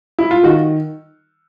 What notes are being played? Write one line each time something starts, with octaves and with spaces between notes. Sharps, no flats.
E4
F4
D#3 F#4